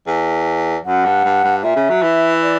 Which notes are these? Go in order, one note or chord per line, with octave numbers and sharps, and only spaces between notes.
E2
F#2 F#5
G2
G2
G2
A#2 E5
C#3
F#3
E3
D5